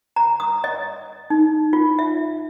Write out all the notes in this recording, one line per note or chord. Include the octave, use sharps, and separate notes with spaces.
A#5
D#6
D#5
D#4
F4
E5